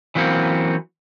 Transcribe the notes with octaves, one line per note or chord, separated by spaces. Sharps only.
E3 F#3 A#3 C4 C#4